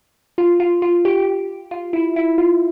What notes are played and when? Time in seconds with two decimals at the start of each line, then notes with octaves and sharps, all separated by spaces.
0.38 F4
0.60 F4
0.82 F4
1.05 G4
1.71 F4
1.93 E4
2.16 E4
2.38 F4